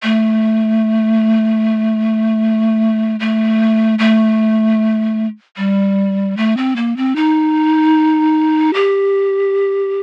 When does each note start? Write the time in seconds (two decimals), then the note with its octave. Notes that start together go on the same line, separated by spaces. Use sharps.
0.03 A3
3.20 A3
3.99 A3
5.57 G3
6.37 A3
6.57 C4
6.76 A#3
6.97 C4
7.16 D#4
8.74 G4